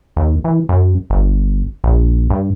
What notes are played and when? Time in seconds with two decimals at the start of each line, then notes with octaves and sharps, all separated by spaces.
0.16 D#2
0.44 E3
0.69 F#2
1.10 G1
1.84 A#1
2.30 G2